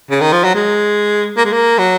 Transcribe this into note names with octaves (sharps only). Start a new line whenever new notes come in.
C#3
D#3
F3
F#3
G#3
A#3
G#3
A#3
F#3